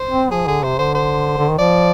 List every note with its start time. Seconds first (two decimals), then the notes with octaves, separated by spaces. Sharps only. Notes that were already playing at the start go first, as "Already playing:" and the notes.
Already playing: C5
0.10 C4
0.31 F3 G#4
0.47 D3 G#4
0.63 C3 C5
0.79 D3 C5
0.95 C5
1.38 D3
1.49 D#3
1.58 F3 D5